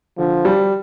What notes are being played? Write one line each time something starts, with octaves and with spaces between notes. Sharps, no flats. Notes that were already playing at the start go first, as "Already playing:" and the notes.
D3 F3
G3